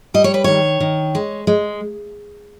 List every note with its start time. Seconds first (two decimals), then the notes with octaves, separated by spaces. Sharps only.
0.14 G3 D#5
0.24 C#5
0.34 B4
0.44 D#3 C#5
0.80 D#3
1.15 G#3
1.47 G#3